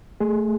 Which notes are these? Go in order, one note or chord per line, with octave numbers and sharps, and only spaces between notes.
A3 G#4